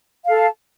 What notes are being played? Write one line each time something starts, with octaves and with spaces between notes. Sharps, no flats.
A4 F5 A5